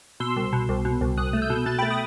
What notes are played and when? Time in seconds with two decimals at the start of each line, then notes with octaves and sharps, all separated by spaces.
0.20 B2 C6 E6
0.37 C2
0.53 B2
0.69 C2
0.85 B2
1.01 C2
1.17 C2 D#6 F#6
1.33 A3
1.42 E6 G6
1.50 B2
1.66 B2 F#6 A6
1.79 G5 B5
1.82 A3
1.90 B5 D#6